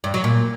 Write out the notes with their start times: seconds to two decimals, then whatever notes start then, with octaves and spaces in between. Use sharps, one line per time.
0.04 G2
0.14 F#3
0.24 A#2